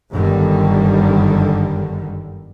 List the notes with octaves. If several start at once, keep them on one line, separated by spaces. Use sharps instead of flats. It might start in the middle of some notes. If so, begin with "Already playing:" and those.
G1 F#2 D3 D#3 G3